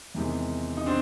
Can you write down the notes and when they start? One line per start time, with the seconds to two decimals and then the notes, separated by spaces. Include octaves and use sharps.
0.15 E2 C3 D#3 G#3
0.77 D#4
0.86 C4 D4